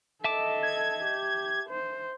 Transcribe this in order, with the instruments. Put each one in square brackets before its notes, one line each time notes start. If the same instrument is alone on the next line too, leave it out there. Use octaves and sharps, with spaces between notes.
[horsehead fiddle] A4 D#5 [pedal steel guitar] E5 A5 D6
[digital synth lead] G#6
[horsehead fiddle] G4
C5